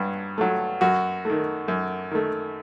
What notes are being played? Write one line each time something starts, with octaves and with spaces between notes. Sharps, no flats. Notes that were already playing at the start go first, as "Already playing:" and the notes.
Already playing: G2 F#3
F#3 A3
F#2 F#4
D#3 A3
F#2
D#3 A3